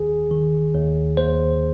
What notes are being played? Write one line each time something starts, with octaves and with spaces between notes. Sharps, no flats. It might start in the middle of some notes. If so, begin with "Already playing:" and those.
Already playing: D#2 D#3 G#4
D#3
D#2
D#2 C5